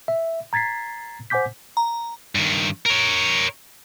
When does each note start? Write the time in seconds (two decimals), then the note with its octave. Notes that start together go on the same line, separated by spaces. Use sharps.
0.08 E5
0.53 A#5 G#6 A6 B6 C7
1.30 C5 F#5 G#5 D6 G6 B6
1.77 A#5
2.35 G2 D#3
2.86 A#4 C#5